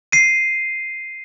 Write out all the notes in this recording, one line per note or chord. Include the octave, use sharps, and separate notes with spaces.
C7 D#7